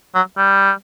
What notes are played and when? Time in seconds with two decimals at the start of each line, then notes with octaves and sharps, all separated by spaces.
0.15 F#3
0.37 G3